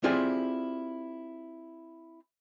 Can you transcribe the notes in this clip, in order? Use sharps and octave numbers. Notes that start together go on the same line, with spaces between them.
C4 E4 F4 G4 G#4 D5